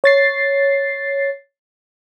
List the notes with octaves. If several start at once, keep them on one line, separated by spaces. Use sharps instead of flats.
C#5 A6 C7